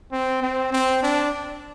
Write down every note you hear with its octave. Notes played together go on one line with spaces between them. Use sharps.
C4
C4
C4
D4